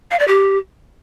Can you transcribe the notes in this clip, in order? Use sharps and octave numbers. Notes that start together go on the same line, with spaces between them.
F5
D5
G4